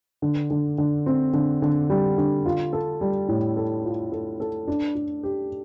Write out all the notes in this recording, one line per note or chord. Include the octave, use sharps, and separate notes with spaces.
D3
D3
D3
C4
D3
D3
G3
D3
F4
A4
G3
A2
A4
F4
A4
A4
D4
D4
G4